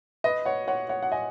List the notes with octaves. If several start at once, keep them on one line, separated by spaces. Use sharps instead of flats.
B4 D#5
C#5 F#5
C#5 F#5
C#5 F#5
F#5
D#5 G#5